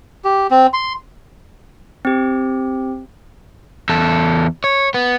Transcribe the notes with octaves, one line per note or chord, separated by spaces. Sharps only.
G4
C4
C6
C4 G4
E2 A4
C#5
B3